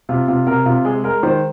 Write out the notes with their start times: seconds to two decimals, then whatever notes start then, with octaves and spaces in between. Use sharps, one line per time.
0.09 C3 F4
0.28 C3 F4
0.47 C3 A#4
0.66 C3 F4
0.85 G#3 G#4
1.04 G#3 A#4
1.23 D#3 C5